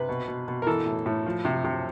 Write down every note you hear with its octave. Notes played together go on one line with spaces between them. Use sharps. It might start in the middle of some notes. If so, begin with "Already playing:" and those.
Already playing: C3 B4
B2
B2
B2
A#4
E3 A4
A2
A2
F3
C3
C3